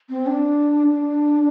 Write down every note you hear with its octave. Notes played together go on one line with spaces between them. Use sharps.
C4
D4
D4